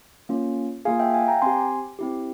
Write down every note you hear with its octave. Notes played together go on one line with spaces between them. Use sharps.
A#3 C#4 F4
A#3 F4 G#4 F5 G#5
E5 G5
F5 G#5
G5 A#5
C4 G4 G#5 C6
C4 E4 G4